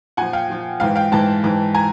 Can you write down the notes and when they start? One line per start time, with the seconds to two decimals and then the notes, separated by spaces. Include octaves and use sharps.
0.17 A#2 F3 F#5 G#5
0.33 F5 G5
0.50 A#2 F3
0.80 G#2 E3 F5 G5
0.96 F5 G5
1.12 G#2 E3 G5 A5
1.44 G#2 E3
1.75 G#5 A#5